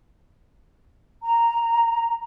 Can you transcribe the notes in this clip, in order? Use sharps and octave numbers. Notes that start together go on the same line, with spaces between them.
A#5